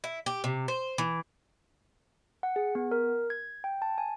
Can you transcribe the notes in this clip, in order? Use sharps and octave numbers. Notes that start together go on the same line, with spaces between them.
E4
G4
C3
C5
E3
F#5
G#4
B3
A#4
G#6
G5
A5
G#5